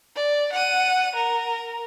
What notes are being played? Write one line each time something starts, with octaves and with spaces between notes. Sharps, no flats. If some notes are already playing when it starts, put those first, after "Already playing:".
D5
F#5 D#7
A#4